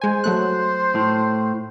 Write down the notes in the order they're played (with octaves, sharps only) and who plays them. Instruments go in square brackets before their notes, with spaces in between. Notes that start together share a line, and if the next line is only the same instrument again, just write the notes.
[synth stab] G#3 G#5 [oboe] C5
[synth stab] F#3 A3 F#6
[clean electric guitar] A2